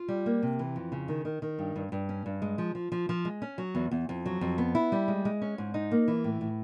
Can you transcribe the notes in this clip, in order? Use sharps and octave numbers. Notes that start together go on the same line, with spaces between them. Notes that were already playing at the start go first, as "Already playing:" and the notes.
Already playing: F4
G3
A#3
C3
E3
F2
C#3
D#3
D#3
D#3
G2
G2
G2
C#4
G2
G#3
F3
F3
F3
F3
G#3
C#4
F#3
E2
E2
F2
F#3
F2
B3
E4
G3
G#3
G#3
C#4
G#2
D#4
A#3
E3
A2
A2